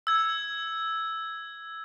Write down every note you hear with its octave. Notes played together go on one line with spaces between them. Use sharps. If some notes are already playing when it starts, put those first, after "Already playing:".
E6 G#6